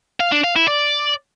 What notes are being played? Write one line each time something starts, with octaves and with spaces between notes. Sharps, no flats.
F5
D4
F5
E4
D5